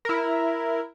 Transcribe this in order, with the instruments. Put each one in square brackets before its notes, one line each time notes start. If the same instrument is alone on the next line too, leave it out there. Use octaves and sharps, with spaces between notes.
[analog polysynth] E4 A#4